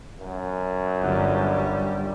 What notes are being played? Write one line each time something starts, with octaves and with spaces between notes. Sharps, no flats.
F#2
G1 G3